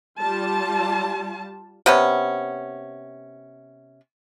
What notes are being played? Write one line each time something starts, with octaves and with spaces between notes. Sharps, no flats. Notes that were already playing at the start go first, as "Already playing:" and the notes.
G3 F4 A5
C3 B3 C#4